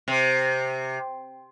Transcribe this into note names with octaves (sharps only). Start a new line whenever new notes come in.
C3